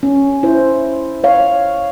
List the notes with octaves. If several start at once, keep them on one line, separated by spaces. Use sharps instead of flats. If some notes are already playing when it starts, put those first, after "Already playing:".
C#4
E4 C5
C#5 F5